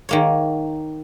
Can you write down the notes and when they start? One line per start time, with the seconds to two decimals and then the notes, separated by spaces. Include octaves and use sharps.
0.09 D#3 A#3 C#5